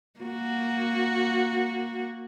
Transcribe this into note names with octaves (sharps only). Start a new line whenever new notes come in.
A#3 F#4